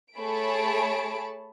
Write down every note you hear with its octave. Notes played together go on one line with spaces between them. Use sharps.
A3 G#4 C#5 A5 B5 D7